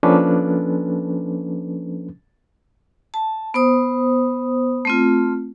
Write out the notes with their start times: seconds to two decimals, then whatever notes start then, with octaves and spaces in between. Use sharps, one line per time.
0.03 F3 A#3 C#4 D4 A4 B4
3.14 A5
3.54 B3 C5 D#6
4.85 A3 C4 F4